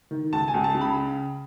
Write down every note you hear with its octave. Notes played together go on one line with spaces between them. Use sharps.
D#3
C#2 A5
G#5
C#2
A5
C#3
B5